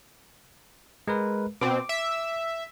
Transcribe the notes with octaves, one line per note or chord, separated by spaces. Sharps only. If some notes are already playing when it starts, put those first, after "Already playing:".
G#3 A#4 B4
B2 C4 D6
E5